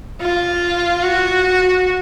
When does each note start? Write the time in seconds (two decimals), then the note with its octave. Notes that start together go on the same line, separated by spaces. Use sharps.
0.21 F4
1.03 F#4